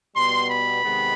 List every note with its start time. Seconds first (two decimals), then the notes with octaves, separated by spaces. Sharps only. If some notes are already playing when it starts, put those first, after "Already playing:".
0.15 B2 G3 B3 C6
0.50 B5
0.83 C3 D#3 G#3 B3